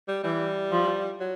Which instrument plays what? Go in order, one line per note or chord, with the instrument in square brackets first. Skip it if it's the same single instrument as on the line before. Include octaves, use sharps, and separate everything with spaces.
[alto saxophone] G3
[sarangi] E3 [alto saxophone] G3
[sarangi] F3
[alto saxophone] F#3